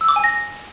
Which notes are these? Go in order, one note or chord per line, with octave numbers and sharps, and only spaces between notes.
E6
D6
G#5
A#6